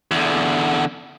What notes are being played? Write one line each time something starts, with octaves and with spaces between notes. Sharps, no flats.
E2 D3